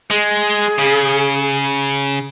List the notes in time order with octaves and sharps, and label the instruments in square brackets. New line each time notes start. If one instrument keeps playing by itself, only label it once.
[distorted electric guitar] G#3 [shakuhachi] G#4
[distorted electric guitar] C#3